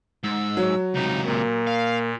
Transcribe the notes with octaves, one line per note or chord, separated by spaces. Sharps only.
G#2 E6
F#3
C#2 C3 D#4
A#2 A#3
F5